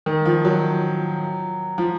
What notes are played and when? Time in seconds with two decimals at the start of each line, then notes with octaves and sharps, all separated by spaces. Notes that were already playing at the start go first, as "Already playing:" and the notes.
0.06 D#3
0.25 F3
0.45 F#3
1.78 F3